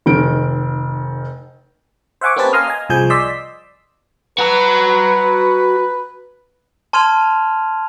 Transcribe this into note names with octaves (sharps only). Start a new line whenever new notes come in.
F1 D#3 D7
C5 E5 F#5 G#5 C#6 D6
A#3 C4 C#4 G4 B4 A5
F5 G#5 A#5 C6 D#6 F6
D#5 G#5
C2 F3 G#4 G#5 G6
D5 D#5 C6 E6 B6
F#4 B4 A#5
A5 C6 F6 G#6 D#7 F7